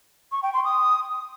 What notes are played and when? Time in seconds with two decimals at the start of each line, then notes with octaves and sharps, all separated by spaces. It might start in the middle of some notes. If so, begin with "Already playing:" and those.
0.32 C#6
0.43 G5
0.54 C6
0.64 D#6